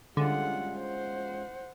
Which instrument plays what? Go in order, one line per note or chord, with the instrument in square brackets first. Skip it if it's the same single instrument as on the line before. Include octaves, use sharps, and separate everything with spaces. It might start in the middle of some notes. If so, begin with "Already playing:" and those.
[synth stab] D3 [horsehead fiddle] G3 F#5 [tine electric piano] G#3 C#4 F4
[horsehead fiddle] C5 F#5